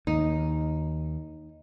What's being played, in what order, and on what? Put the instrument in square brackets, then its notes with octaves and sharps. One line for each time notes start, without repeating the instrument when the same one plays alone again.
[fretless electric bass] D#2 [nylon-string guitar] D#4